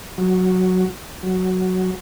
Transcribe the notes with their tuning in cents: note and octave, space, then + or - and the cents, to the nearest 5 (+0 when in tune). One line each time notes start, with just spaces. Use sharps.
F#3 -5
F#3 +0